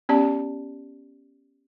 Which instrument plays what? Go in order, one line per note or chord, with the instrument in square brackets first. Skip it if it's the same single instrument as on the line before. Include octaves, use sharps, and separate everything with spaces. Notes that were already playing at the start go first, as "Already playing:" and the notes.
[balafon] B3 C#4 G4 D5 A5